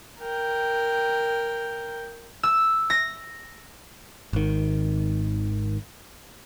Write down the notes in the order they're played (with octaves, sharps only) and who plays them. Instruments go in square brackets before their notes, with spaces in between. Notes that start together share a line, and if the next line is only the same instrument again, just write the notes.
[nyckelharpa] A#4 G5
[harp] E6
A#6
[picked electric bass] G#1 D#3